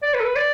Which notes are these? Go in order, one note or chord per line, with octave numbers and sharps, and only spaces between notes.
D5
B4
A4
B4
D5